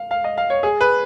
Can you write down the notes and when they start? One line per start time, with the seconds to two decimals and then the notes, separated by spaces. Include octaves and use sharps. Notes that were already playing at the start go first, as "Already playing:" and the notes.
Already playing: F5
0.11 F5
0.24 D#5
0.38 F5
0.50 C#5
0.63 G#4
0.81 B4